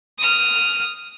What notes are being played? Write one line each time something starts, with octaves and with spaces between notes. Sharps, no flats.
D#6 F6